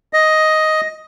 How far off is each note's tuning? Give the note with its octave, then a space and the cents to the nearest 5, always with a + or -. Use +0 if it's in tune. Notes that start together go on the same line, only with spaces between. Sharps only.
D#5 +5